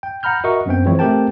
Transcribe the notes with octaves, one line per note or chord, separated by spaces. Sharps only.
G5
F#5 A#5 B5 F6 G6
F#4 A#4 D#5 E5 F#5 C#6
F#2 B3 C4 G5
E3 F3 G#3 C4 E4 C#5
A3 C4 G4 A#4 G5 A5